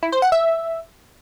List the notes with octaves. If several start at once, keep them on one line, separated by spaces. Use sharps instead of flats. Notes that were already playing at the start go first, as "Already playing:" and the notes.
E4
C5
F#5
E5